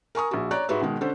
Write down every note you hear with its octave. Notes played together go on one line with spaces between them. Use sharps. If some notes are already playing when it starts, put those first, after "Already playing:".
A#4 G#5 C#6 D#6
A#1 F#4
C#5 D5 A#5 F#6
G#2 F#4 B4 E5
B2 D#3 G#3
D3 C#4 A4 C5